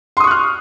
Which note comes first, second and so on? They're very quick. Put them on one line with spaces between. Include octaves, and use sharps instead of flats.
C6 D#6 C#6 F#6 F6